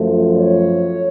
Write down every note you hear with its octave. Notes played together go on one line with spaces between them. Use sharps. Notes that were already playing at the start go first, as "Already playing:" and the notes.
Already playing: F#2 F3 A3
C#5